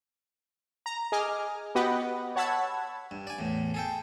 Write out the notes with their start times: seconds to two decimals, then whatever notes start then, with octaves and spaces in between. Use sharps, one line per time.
0.86 A#5
1.12 G#4 D#5 G#5 D6 F6
1.75 B3 F#4 G4 B4 D#5 F#5
2.36 C#5 F#5 A5 B5 E6 G#6
3.11 G2
3.27 D5 G#5
3.39 E2 A2
3.74 G#4 A4 G5